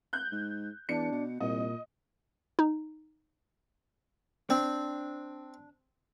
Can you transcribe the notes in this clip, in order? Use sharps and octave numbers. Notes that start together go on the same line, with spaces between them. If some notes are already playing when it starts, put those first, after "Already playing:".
F#6 G6
G#2
E2 D4 C#7
B2
C2 A#2 D#5
D#4
C4 D4